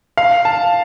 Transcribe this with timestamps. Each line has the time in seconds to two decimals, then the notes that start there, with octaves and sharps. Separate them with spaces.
0.17 F5
0.45 A5